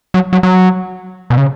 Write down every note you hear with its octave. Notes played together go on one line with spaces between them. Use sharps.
F#3
F#3
F#3
B2
C#3